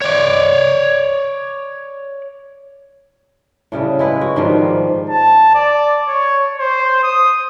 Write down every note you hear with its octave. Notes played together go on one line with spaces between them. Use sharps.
C#5 D5
A2 C#3 G3 A3
G#3 E4 B4
F#4
G#2 D#3 F3 G3
A5
D5
C#5
C5
D#6